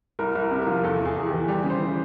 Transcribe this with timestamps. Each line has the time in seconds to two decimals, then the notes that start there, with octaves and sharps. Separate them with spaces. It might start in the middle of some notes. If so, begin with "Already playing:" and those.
0.19 C2 A#4
0.35 C2
0.41 A#4
0.51 C3
0.62 A#4
0.67 F3
0.84 E2 A4
1.00 E2
1.05 G#4
1.16 E2
1.27 E3 G4
1.48 G3 G4
1.64 C#3
1.70 C5
1.80 E3